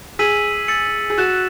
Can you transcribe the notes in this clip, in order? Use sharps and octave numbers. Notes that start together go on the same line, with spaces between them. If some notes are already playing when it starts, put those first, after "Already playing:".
G#4 E6 B6 D#7 F#7
E6 A6 C#7 F#7
G#4
F#4 F#6 A6 C#7 E7